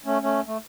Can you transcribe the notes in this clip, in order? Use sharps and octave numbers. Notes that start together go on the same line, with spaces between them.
A3 C#4
A3 C#4
A3